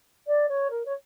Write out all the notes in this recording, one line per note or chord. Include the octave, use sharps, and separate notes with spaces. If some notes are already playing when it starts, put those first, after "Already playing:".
D5
C#5
A#4
C#5